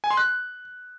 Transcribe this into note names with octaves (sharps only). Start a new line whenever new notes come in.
G#5
C6
F#6